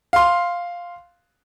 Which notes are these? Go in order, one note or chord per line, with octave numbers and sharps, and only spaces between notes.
F5 C6